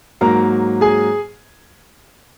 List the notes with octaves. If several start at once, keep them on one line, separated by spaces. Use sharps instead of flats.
G#2 F#3 A#3 A#4 A#5
G#4 G#5